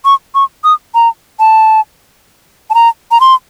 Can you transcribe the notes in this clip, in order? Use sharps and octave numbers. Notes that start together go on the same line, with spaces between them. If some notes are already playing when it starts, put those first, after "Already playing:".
C#6
C#6
D#6
A#5
A5
A5
A#5
A#5
C6